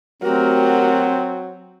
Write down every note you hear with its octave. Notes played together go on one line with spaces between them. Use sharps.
F#3 A3 C4 F#4 G4 A#4